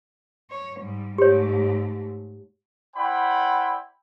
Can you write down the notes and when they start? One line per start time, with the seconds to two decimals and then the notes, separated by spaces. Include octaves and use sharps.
0.51 C#5
0.80 G#2 G3
1.18 G#2 A3 G4 C#5
2.96 E4 C5 D5 F#5 G5 B5